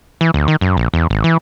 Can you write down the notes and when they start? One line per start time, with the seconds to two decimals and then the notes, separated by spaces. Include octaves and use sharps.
0.21 E3
0.34 D2
0.48 D#3
0.61 F#2
0.77 A#1
0.94 E2
1.10 G#1
1.24 E3